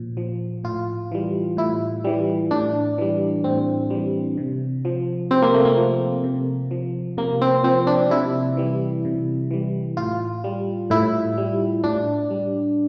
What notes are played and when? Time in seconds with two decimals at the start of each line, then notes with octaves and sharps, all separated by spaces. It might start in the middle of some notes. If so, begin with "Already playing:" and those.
Already playing: A#2 F3
0.17 F3
0.64 A2 F4
1.11 E3 G3
1.57 A2 E4
2.04 E3 G3
2.51 A2 D4
2.98 E3 G3
3.44 A2 C4
3.90 E3 G3
4.37 C3
4.85 F3
5.31 C3 C4
5.42 A#3
5.54 A3
5.65 A#3
5.77 F3
6.24 C3
6.71 F3
7.17 C3 A#3
7.41 C4
7.64 F3 C4
7.87 D4
8.10 C3 E4
8.57 E3 G3
9.05 C3
9.51 E3 G3
9.97 A2 F4
10.44 G3
10.90 A2 E4
11.38 G3
11.84 A2 D4
12.30 G3